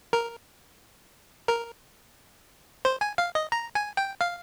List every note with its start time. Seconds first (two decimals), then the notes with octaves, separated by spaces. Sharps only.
0.13 A#4
1.48 A#4
2.85 C5
3.01 G#5
3.18 F5
3.35 D#5
3.52 A#5
3.75 G#5
3.97 G5
4.21 F5